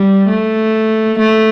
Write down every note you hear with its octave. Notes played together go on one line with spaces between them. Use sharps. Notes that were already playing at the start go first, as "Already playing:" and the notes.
Already playing: G3
A3
A3